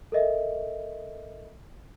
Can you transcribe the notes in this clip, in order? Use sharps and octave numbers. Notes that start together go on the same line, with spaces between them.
A4 A#4 D#5 E5